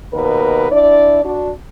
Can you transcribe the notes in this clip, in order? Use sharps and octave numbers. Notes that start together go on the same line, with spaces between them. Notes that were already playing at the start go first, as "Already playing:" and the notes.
D#2 B2 A#4 B4
D4 E4 D5
D4 F#4